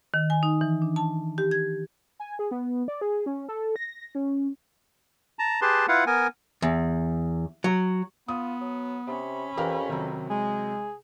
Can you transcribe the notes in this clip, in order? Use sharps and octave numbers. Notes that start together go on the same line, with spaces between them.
D#3
G#5
D#4
E3
D4
A5
G4
G#6
G#5
G#4
B3
D5
G#4
C#4
A4
A#6
C#4
A5 A#5
G4 G#4 B4 A5 C6
E4 F4 B4 F5 F#5
B3 A#4 G#5
E2
F#3
B3 F4 D#6
F#3
C3 C#4 B5
F2 E3 G4 A#4 F5
C3 D#3 F#3
G#3 G#4